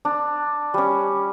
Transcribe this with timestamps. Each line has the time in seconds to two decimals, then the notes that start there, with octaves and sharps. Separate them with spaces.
0.05 D4
0.74 G3 C#4